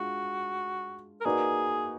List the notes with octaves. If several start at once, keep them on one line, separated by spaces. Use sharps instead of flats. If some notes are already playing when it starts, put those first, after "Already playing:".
Already playing: G#3 D4 F4 F#4
A#4
A#3 D#4 F#4 G#4 B4 D5